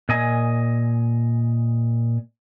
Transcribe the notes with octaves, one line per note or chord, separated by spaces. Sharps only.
A#2 D#5 G#5